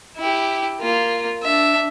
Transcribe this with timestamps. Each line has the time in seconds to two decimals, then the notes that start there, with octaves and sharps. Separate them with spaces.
0.17 E4 G4
0.80 A#3 F4
1.42 D4 E5